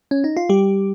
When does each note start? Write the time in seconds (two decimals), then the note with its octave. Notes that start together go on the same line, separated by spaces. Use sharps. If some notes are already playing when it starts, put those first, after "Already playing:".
0.11 C#4
0.24 D#4
0.37 F4
0.49 G3 G4